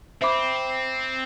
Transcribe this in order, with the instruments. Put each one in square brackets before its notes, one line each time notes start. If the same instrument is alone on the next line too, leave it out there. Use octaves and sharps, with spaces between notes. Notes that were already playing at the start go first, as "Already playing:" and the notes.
[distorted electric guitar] C4 [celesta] C5 E5 B5 D6